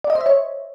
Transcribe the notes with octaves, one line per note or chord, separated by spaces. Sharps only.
D5
D#5
C5
E5
C#5